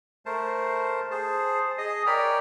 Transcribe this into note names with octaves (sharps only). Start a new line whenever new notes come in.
A3 A#4 C5 A5
G#4 C5 A5
G#4 D#5 D#6
A#4 C#5 D5 G5 B5 F6